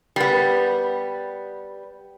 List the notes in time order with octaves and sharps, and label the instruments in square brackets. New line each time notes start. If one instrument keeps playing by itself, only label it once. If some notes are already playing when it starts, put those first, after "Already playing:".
[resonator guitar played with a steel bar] G3 B3